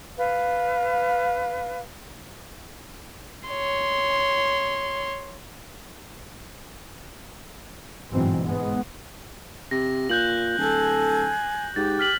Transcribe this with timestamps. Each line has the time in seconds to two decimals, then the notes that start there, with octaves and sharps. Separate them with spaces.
0.18 B4 F5
3.48 C#5 C6
8.12 G1 G#2 B2 E3 F#3 C4
8.44 G#2 G#3 B3
9.71 C3 A#6
10.10 A#2 F#6 G6 F#7
10.58 D1 A4 G#5
11.76 G#2 G4 A6
11.99 F6 B6 F#7